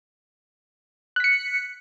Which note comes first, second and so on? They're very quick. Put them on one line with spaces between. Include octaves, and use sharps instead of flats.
F#6 B6 C#7